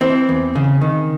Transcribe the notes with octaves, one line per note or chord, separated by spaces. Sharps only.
E3 C4
E2
C#3
D#3